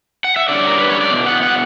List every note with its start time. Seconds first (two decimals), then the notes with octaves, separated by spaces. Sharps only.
0.24 F#5
0.36 E5
0.49 D3 G3 C#4 D5
0.67 A#4
0.78 B4
0.89 C#5
1.00 D5
1.11 E2 B2
1.26 F#5
1.43 F#5